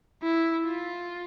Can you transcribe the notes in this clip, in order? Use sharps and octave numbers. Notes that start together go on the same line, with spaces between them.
E4
F4